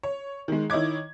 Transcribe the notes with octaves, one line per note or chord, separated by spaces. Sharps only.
C#5
D#3 G#3
D#3 E4 C#5 D#5 D6 G#6